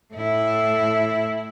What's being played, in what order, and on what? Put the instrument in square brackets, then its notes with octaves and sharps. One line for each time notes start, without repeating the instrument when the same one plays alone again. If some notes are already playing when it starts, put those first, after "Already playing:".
[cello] A2 E4